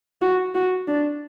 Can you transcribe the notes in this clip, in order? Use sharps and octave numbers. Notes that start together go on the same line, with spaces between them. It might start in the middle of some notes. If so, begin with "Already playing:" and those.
F#4
F#4
D4